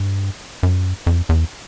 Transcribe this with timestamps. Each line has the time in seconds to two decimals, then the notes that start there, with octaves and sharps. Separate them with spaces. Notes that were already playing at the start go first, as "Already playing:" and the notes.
Already playing: G2
0.63 F#2
1.07 F2
1.29 E2